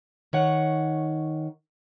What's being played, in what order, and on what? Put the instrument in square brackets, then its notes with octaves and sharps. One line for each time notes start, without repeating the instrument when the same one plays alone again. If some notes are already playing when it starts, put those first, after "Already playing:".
[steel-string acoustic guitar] D#3 C#5 F#5